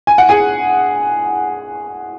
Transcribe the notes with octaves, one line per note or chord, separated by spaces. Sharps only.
G#5
F#5
G#4 G#5